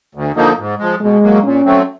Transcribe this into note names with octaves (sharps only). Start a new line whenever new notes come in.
D2
D3 F3 A#3 D#4
G#2
F3 G#3
B2 G#3
F#3 A#3
A#2 C#4
F#3 A3 C4